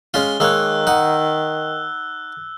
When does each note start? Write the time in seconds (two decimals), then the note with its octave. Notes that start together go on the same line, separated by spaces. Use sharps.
0.14 G#3 C#4 F4 G7
0.40 D#3 G#3 A#3 C#5 E6 F#6
0.87 D#4 F#5